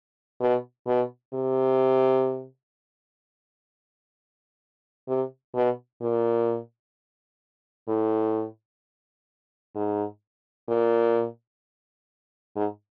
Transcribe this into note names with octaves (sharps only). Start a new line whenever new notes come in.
B2
B2
C3
C3
B2
A#2
A2
G#2
A#2
G#2